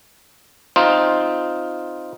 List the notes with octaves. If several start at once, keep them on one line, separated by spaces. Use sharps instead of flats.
C4 D#4 F4